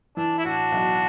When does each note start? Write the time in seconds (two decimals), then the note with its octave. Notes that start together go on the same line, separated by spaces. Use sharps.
0.17 E3 D4
0.38 E4
0.44 A2 D4 F#4
0.72 B1